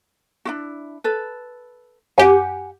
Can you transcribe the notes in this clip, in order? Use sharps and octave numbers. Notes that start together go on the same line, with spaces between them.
D4 E4 F#4
A4 B4
F#2 G4 F#5 G#5